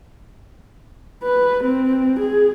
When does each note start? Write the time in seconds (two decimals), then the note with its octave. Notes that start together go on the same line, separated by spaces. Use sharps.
1.23 B4
1.64 C4
2.20 G#4